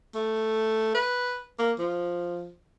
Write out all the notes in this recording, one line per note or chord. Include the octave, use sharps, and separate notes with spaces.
A3
B4
A#3
F3